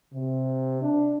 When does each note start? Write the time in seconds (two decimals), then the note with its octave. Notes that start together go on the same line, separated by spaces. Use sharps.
0.15 C3
0.82 D4